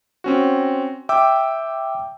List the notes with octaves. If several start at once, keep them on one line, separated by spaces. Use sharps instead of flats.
C4 C#4 F#4
E5 G5 D6 E6